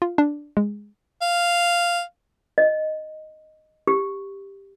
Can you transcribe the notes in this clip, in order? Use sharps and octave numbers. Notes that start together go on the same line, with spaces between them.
F4
D4
G#3
F5
D#5
G4